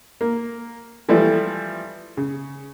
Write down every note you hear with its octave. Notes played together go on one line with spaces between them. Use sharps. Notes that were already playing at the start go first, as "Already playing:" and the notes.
A#3
E3 F3 G3 A3
C#3